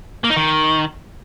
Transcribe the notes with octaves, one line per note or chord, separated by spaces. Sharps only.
A#3
D#4
D#3